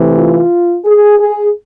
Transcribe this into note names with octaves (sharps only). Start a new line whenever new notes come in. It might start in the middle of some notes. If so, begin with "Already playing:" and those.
Already playing: C3 E3 A3
F4
G#4
G#4